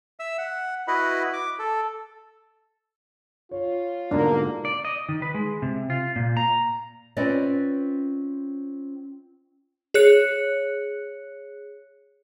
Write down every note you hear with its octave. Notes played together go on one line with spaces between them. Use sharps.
E5 E6
F#5
E4 F#4 B4 D#5 B5
D6
A4
F4 C#5
G#2 B2 D3 A#3 D4
D5
D#5
D#3
B4
G#3
C3
F4
A#2
A#5
C4 C#4 F4 B4 D5 D#5
G#4 C#5 F#6 C#7